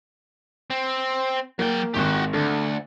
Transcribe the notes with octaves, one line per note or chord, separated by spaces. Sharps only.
C4
F#3 A#3 G5
G#1 D#3 F#4 G4
D2 D3